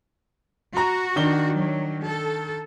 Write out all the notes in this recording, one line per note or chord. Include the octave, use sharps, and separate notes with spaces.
F#4 A#5
D#3 D4 G7
F#3
A4